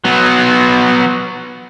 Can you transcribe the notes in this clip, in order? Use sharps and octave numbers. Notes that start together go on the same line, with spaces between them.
F#3 B3